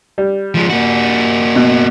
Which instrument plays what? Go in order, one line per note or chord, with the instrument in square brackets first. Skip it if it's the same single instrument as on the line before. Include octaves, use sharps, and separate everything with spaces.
[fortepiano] G3
[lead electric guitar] F3 G#3
A#3 F#4
[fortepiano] B2